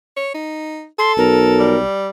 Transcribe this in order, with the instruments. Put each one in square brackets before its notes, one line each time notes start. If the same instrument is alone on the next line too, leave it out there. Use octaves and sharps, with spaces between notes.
[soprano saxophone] C#5
D#4
[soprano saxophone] A4 [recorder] C6
[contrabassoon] B1 [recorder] A#4
[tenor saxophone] G3